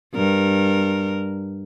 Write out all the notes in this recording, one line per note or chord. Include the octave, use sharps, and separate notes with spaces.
G2 A#4